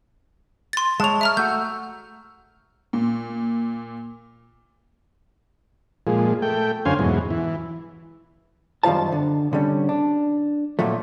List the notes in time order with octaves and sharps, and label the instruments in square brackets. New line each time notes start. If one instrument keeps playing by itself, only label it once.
[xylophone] C6 A6
[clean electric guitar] G#3 C#5 [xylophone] A5 F7
[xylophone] E5 A#5 F6
[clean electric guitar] A3 F#4 [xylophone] G6
[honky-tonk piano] A#2
[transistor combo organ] A#2 F3 G#3
A3 G5
F#2 D3 C#4 C5 F5 G#5
E2 G#2 B2 F#3
E3
[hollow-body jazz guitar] F#2 D#3 G3 F4 C5 A5
D3
D3 G3 C#4
D4
A#2 F3 F#3 A3